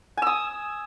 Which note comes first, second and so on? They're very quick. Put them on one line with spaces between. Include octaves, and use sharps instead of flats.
G#5 E6 D#6